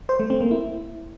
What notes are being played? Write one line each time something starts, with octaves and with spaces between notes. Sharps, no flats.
C5
A3
C4
A#3
E4